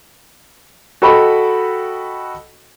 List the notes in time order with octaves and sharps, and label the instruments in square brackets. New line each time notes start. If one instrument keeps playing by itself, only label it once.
[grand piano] F#4 A4 D#5 G5 B5 C#6